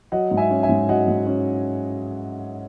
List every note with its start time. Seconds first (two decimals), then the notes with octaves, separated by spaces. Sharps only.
0.12 F#3 D#5 F#5
0.31 G#2
0.37 E5 G#5
0.51 C#4
0.63 E5 G#5
0.69 G#2
0.89 F#3 D#5 F#5
1.08 G#2
1.27 C#4